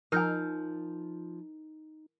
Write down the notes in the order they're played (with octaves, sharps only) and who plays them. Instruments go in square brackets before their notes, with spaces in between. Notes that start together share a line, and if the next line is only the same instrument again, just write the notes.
[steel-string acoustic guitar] F3 [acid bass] D#4 [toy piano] A#4 G#5 [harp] F6 G6